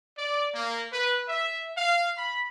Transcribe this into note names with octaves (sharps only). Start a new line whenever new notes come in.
D5
A#3
B4
E5
F5
B5